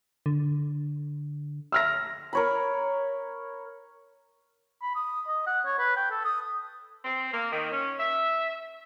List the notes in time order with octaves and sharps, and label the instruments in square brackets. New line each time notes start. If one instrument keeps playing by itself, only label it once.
[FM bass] D3
[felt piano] E6 F6 A#6
[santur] A#4 C#5 B5
[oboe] B5
D#6
D#5
F#5
C#5
B4
G5
A4
D#6
[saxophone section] C4
A#3
D#3
C#4
E5